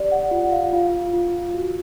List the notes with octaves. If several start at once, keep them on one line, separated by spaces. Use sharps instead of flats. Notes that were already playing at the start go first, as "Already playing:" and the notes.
Already playing: G4 D5
F#5
F4 F#5
F5
F4 F5
F4
F#4